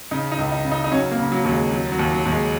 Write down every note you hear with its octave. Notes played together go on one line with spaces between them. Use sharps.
C#3 D#4
D#4
C#2
D#4
C#3
D#4
D#4
F#3 C#4
A#3
C#3
F#3
D#2 F#3
G#3
F#3
F#3
D#2
F#3
D#2
G#3